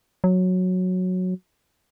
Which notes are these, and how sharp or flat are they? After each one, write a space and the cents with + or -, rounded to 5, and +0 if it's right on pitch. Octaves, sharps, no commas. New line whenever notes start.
F#3 -10